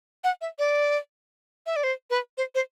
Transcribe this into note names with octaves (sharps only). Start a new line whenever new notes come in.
F#5
E5
D5
E5
D5
C5
B4
C5
C5